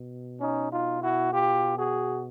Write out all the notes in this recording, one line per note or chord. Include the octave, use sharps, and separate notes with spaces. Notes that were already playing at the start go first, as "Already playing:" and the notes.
Already playing: B2
C#4 D#4
D#4 F4
E4 F#4
F4 G4
F#4 G#4